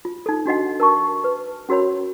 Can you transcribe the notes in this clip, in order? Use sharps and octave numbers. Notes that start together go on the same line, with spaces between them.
F4
D#4 A4
D4 F#4 D#5 F#5
A#4 A5 C#6
B4
C#4 F#4 A#4 C#5 B5